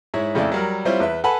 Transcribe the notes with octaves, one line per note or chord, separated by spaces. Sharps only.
G#2 E4 C#5
F2 C#3 A3 E4 D5
F#3 G3 A#4
G3 C4 E4 F4 C5 C#5
E2 B4 E5
A4 B4 F#5 G#5 A5 B5